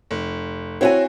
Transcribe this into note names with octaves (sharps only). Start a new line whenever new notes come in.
F1
C4 E4 F#4 C#5 F#5 G#5